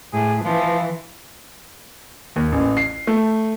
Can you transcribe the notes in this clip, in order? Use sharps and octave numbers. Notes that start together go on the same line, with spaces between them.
A2 G#4
E3 F3
D#2
A1
C7
A3